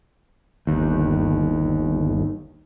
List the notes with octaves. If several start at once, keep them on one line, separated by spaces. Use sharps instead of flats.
G1 D#2